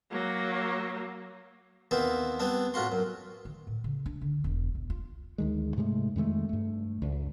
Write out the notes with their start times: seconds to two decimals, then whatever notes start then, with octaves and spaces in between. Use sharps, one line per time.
0.11 F#3 A#3
1.91 D#2 E3 B3 C4 C5
2.39 G3 B3 C4 D4
2.74 A2 F4 F#4 C6
2.92 F#2
3.45 D#3
3.67 A2
3.84 C#3
4.06 D4
4.21 D3
4.44 E1
4.75 B1
4.90 F4
5.38 D2 D#3 G#3
5.76 G#2 C3 G#3 A3
6.16 F2 D#3 G#3 A3
6.49 G2 A3
7.02 C#2